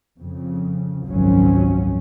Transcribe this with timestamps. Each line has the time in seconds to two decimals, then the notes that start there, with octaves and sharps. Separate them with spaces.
0.19 F2 C#3
1.05 G#1 C#2 F#2 F3 F#3 C#4